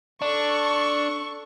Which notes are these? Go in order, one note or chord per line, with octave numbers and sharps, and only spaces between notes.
D4 A4 C#6